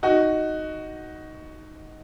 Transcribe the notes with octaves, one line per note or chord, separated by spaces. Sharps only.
D#4 F#4